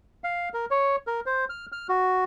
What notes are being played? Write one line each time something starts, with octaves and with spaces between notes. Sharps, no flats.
F5
A#4
C#5
A#4
C5
F6
F6
F#4